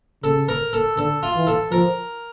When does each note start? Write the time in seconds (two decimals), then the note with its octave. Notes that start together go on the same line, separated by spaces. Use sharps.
0.23 C#3 A4
0.49 A#4
0.73 A4
0.97 D3 A4
1.23 F4
1.35 E3
1.47 A4
1.72 F3 A#4